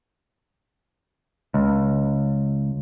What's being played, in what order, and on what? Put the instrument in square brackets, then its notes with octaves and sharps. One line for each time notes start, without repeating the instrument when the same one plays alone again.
[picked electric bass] C#2